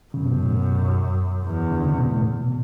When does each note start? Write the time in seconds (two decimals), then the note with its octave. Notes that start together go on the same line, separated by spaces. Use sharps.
0.14 F#2 C#3
0.26 B2
0.38 A2
0.50 B2
1.45 E2
1.71 D3
1.84 C#3
1.97 B2
2.09 A2
2.41 B2